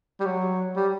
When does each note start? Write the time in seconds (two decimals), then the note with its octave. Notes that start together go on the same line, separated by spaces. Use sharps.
0.20 G3
0.25 F#3
0.76 G3